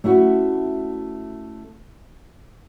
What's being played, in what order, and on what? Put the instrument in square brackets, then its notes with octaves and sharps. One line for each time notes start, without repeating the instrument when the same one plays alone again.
[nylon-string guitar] A3 C#4 E4 F#4